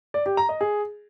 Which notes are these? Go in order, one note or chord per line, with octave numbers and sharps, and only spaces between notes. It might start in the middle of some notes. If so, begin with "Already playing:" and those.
D5
G4
A#5
D#5
G#4